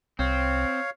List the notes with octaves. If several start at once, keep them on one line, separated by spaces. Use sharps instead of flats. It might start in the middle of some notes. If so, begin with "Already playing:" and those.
C2 C4 C#5 F5